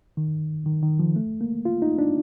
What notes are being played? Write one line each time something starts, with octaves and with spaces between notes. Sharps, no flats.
D#3
D#3
D#3
F3
A3
A#3
F4
D#4
D4